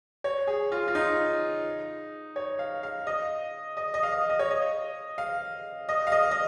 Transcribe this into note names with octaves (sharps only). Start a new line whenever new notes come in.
C#5
G#4
F4
F4
D#4
C#5
F5
F5
D#5
D#5
D#5
F5
D#5
D#5
C#5
D#5
F5
D#5
F5
D#5
D#5